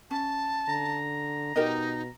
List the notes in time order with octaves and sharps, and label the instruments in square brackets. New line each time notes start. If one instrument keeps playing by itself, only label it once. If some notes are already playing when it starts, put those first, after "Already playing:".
[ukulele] C#4 [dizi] A5
[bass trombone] D3 [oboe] A#5
[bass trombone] B2 [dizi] D#4 [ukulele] G4 A#4 D#5